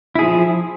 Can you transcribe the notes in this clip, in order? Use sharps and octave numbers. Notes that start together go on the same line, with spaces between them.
F3 E4 G#4